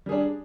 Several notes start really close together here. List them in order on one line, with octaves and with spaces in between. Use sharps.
G3 G#4 D4